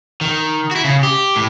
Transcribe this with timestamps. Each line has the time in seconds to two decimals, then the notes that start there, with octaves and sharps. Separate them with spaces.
0.21 D#3
0.71 E4 F#4
0.84 C#3
1.03 G4
1.36 A2